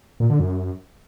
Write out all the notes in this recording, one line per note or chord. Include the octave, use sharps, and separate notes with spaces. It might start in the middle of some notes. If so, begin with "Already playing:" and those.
A#2
D3
F#2